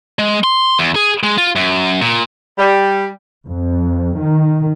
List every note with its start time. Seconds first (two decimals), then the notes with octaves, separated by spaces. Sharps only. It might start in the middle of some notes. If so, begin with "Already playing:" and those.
0.19 G#3
0.44 C6
0.79 E2
0.96 G#4
1.23 G#3
1.38 F4
1.56 F#2
2.01 A#2
2.58 G3
3.46 F2
4.20 D#3